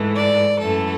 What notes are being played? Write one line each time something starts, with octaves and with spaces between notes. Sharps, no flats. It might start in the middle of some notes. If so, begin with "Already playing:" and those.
Already playing: G#2 E3 A3
D5
F#2 E3 A3 A4